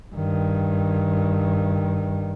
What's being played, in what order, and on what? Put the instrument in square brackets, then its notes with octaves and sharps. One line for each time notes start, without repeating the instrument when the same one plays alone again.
[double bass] G2 D#3